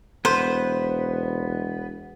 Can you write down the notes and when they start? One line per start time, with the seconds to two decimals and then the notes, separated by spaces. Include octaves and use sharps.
0.25 E1 B3 B4 C5